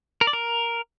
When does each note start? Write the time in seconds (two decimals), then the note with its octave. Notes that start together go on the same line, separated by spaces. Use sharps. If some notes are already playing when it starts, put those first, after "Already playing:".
0.21 A#4
0.27 D5
0.33 A#4